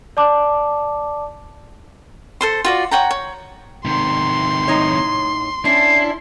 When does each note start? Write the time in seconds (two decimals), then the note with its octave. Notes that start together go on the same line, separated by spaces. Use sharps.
0.17 D5 A5 D6
2.41 A4 C5 C6
2.65 F4 F#4 D5
2.91 C#5 F#5 G5 A#5
3.11 C#5
3.85 C3 D#3 C6
4.68 A2 D#4 C#5
5.65 C#4 D4 E4 C7